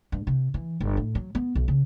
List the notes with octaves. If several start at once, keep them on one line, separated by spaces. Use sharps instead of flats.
G2
C3
E3
G1
A2
F#3
B3
B1
C#3